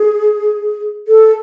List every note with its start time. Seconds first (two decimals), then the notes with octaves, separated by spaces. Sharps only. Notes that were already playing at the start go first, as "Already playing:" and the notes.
Already playing: G#4
1.08 A4